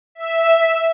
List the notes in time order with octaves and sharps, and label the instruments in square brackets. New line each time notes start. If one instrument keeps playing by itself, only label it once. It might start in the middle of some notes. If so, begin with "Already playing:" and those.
[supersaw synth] E5